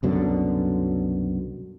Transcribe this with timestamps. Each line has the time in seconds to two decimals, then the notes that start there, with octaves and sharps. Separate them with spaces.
0.03 C2 F#2 B2 D3